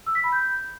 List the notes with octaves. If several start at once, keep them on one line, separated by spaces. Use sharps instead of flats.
E6
B6
B5
G6